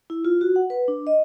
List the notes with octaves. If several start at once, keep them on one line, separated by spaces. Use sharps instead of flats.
E4
F4
F#4
F#5
B4
D4
D#5